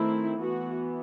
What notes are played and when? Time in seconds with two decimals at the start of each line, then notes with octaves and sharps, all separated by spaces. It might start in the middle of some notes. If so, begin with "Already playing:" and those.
Already playing: D#3 A3 C4 E4
0.40 E3 B3 F#4